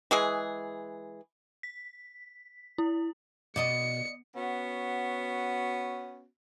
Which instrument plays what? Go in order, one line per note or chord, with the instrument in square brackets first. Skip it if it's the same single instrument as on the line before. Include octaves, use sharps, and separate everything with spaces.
[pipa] E3 G#3 G#4
[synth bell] B6
E4
[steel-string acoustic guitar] B2 [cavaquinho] D5 D#5 D#6 [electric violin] C#7
[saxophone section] B3 C#4 F#4